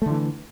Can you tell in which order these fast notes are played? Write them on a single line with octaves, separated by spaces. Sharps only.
A3 D3 E3